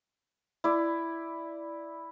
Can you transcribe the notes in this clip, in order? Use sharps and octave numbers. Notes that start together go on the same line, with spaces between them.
E4 D5